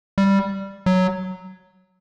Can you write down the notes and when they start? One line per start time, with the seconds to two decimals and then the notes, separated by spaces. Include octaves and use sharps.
0.18 G3
0.86 F#3